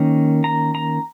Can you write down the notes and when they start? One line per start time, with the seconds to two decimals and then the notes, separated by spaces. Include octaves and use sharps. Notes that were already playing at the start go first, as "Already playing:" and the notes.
Already playing: D#3 A#3 C#4 A#5
0.44 A#5
0.75 A#5